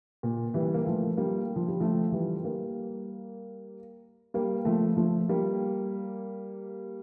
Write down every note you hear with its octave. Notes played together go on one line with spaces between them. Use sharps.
A#2
E3 G3
A#3
F3 A3
G3 A#3
F3
G3
F3 A3
E3 G3
G3 A#3
G3 A#3
F3 A3
F3 A3
G3 A#3